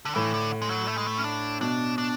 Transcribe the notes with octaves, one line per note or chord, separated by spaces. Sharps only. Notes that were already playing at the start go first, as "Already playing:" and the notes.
D3
A2 E3
D3
G#3
F#3
A3
G#3
A3
C#4
D4
B2 D4
D4